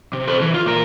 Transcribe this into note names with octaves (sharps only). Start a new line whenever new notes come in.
C3
A4 C5
E3
F4
A#2 A#4